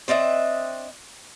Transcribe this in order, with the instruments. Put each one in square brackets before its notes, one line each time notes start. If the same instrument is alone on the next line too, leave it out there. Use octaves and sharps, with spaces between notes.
[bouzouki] C4 D4 D#5 E5